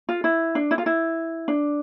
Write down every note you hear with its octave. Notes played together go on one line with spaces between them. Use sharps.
F4
E4
D4
E4
F4
E4
D4